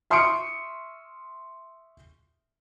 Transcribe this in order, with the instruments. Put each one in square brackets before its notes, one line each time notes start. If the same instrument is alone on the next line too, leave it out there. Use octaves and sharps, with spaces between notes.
[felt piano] E5 C6 C#6 D#6 C#7 D7